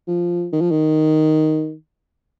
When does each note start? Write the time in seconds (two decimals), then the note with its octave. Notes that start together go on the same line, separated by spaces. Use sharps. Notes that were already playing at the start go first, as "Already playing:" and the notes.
0.08 F3
0.53 D#3
0.61 F3
0.71 D#3